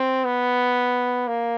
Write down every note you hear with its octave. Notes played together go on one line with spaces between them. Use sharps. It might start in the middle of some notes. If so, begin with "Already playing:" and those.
Already playing: C4
B3
A#3